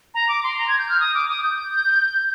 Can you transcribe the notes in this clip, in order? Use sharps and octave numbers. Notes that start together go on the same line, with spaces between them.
A#5
D6
C6
A#5
G#6
G6
F6
D#6
D6
D#6
G6